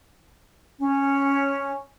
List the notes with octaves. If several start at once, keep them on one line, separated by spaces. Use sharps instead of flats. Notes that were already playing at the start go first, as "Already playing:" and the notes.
C#4